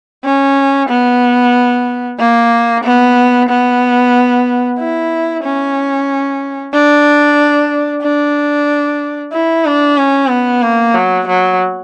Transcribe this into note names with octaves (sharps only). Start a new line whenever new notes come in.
C#4
B3
A#3
B3
B3
E4
C#4
D4
D4
E4
D4
C#4
B3
A#3
F#3
F#3